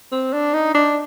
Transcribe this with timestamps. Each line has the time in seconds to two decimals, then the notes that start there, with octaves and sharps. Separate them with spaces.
0.12 C4
0.33 D4
0.54 D#4
0.74 D4